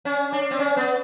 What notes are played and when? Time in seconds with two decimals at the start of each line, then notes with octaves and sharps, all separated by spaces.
0.05 C#4
0.32 D4
0.51 C4
0.59 C#4
0.77 B3